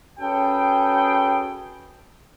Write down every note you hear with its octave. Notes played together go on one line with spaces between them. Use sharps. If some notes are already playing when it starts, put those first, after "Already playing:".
C#4 F#4 G#4 A4 B4 G5